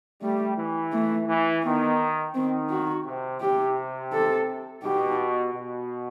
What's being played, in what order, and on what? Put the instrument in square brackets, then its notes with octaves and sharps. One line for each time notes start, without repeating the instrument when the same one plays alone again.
[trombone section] G3 [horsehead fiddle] A3
[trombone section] E3
[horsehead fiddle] A3
[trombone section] E3
[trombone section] D#3 [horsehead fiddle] B3
[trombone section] D#3 [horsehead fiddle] C4
[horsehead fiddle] F#4
[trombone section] C3
[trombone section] C3 [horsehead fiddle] G4
[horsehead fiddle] A4
[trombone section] B2 [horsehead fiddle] G4
[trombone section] B2